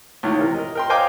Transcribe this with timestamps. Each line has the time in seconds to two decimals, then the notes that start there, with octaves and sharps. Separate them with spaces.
0.23 C#2 A2 D#3
0.38 C3 E3 A#4
0.54 A#4 D#5
0.75 A#4 G5 C6
0.90 C5 D#5 F5 G5 G#5 D6